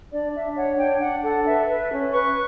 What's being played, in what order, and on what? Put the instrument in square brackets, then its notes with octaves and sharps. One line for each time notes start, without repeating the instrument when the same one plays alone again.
[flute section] D4 D5
D4 E5
C#5 F#5
D4 G5
D4 F#5
A4 F#5
B4 E5
B4
C#4
B4 C#6